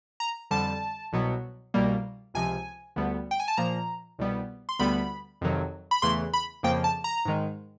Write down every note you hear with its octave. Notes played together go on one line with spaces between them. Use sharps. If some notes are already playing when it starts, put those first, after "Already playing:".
A#5
F2 D3 G3 A5
C2 B2 F#3 B3
C2 B2 G3 A#3
C#2 C3 F3 G#5
D2 D3 G3 B3
G5
G#5
A5
A#2 F3 A#3 A#5
C2 B2 G3 B3
C6
D2 D3 G3 B3 B5
F2 C3 D#3 F#3
B5
E2 C#3 E3 A3 C6
B5
F2 C#3 F3 A#3 G5
A5
A#5
G#2 D#3 G#3